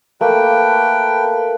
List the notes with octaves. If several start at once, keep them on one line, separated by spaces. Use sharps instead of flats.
A3 A#3 B4 G5